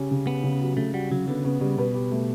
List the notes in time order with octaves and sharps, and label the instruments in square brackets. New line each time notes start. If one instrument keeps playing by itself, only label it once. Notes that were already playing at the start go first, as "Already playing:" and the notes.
Already playing: [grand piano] C#3 C#4 G4
C#3
[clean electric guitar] B3 [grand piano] G4
[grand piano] C#3
F#3
[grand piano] C#3 [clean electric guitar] A3
[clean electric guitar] G3 [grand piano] F#4
[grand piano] C#3 [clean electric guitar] F#3
[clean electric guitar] D3 [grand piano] B3
[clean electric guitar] C#3 [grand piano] B3
[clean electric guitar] C#3 [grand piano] G3
[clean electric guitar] B2 [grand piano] B4
[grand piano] G4
A3